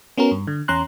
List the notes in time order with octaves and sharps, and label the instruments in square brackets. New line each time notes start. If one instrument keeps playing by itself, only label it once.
[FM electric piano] B3 C#4 F#4 A#4
G2
D3
E2 C#4 A#5 C6 F#6